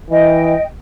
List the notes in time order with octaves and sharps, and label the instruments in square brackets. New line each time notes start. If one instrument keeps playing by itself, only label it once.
[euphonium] E3 [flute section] D#5 G5